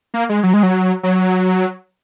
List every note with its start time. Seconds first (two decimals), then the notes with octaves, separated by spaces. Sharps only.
0.14 A#3
0.29 G#3
0.43 F#3
0.53 G#3
0.63 F#3
1.03 F#3